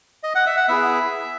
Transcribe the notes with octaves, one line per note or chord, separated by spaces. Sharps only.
D#5
F#5
E5
F#5
B3 E4 G#4 E5